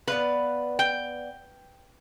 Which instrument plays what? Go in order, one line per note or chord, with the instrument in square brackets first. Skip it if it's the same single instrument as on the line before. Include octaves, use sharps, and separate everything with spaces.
[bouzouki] B3 D5 F5 [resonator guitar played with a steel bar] B4
[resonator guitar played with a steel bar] G5